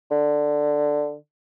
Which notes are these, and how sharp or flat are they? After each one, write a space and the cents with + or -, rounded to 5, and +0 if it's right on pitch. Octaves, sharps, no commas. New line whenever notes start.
D3 +5